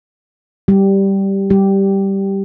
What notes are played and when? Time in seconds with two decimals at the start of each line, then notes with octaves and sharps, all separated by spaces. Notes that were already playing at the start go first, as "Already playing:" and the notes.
0.68 G3 G4
1.50 G3 G4